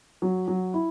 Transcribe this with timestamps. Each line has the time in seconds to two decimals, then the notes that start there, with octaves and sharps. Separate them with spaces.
0.22 F#3
0.48 F#3
0.74 E4